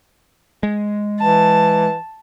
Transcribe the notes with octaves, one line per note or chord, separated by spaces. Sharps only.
G#3
E3 A5